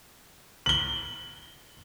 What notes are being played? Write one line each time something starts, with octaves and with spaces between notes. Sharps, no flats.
F#7 G7